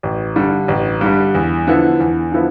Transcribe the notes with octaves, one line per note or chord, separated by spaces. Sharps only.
A1
G2 D3 G3
A1
G2 D3 G3
E2
D3 F3 B3 E4
E2
D3 F3 B3 E4